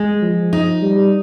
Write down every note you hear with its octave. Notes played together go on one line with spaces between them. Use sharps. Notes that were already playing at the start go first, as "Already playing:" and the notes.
Already playing: G#3
F3
D#4
G3